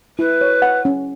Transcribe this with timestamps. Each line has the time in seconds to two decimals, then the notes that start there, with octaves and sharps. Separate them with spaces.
0.19 E4 B4
0.41 C#5
0.62 F#5
0.85 C#4